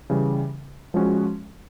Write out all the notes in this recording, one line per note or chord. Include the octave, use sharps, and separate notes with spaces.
C#3 E3 G3
F3 G#3 C#4 F#4